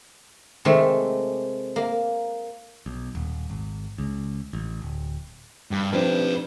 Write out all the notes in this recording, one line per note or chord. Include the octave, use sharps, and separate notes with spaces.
C3 D#3 G#3 A3
A#3
B1
D#1
G#1
C#2
A1
D1
G2
F3 C4 D4 B4 D5